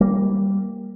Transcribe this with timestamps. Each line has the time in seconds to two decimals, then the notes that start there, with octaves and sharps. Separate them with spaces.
0.01 G3 A#3